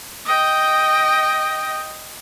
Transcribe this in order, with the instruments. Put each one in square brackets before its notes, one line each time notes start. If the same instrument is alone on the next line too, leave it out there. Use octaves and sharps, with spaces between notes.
[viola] D#5 G5